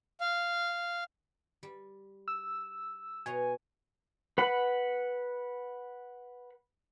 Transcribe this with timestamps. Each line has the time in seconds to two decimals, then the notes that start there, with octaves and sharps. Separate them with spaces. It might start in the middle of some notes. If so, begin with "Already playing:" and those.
0.20 F5
1.63 G3
2.28 E6
3.26 B2 C#5 G#5 A#5
4.38 B4 F#5 B5